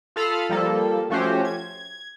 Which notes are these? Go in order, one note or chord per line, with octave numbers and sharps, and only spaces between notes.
F4 A4 F5 B5 D#6 F6
F3 G3 A#3 A4
F3 A3 C#4 F#4 G4 C5
G#6